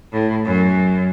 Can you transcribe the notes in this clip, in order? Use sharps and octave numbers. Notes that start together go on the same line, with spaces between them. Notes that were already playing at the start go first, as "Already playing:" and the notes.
A2
F#2